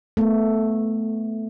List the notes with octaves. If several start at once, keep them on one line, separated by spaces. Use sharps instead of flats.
A3 B3